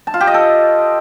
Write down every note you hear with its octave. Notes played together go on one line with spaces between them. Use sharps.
A5
F4
G4
D#5
A4